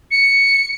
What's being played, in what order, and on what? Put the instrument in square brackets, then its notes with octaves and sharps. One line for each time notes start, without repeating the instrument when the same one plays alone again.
[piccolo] C#7